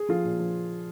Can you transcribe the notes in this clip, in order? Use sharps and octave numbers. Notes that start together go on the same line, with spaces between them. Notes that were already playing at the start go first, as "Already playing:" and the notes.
Already playing: G#4
F3 F4
A#2
F3